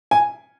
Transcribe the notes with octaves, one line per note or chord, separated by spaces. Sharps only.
G#5